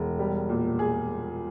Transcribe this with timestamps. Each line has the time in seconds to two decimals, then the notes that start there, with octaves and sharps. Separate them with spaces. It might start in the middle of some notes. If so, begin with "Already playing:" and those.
Already playing: E1
0.19 G3
0.49 A#2
0.79 G#4